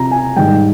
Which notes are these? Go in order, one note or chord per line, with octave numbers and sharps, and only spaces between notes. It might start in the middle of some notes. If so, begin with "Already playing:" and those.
Already playing: C3 F3 A#5
G#5
G#2 D#3 G3 G5